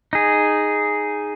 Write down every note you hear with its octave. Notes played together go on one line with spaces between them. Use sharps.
D#4 G#4